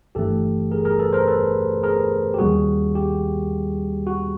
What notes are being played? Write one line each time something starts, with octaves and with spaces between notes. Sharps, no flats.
G1 G2 E3 A3 G4 A4
G#4 A#4
G#4 A#4
A4 B4
A#4 C5
A4 B4
G#4 A#4
G4
D#2 D#3 G3 A#3 C#4 F#4 G#4
G4
F#4